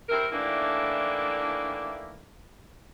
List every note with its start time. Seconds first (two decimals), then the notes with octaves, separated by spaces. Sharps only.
0.09 G2 C4 E4 A#4
0.32 D#3 E3 A3 A#3 D4 E4